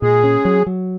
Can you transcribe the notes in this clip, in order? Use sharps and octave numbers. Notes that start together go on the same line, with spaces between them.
A#2 G#3 G#4
C#4
F#3
F#3